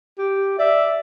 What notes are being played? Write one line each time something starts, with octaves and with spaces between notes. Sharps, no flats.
G4
D5 E5